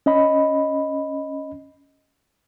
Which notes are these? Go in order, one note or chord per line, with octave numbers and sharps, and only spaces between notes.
C#4 D#5 B5